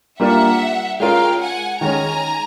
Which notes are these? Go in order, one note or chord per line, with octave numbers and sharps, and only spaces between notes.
G3 A#3 D4 F4 A#4 E5 F#5
G#3 C#4 F4 A#4 F5 G5
F#5 G#5
D#3 G#3 C#4 G#5 A#5